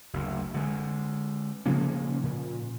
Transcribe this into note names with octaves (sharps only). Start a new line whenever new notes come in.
F#1 D2
D3 G#3
C#3 F3 A#3 C#4
A#2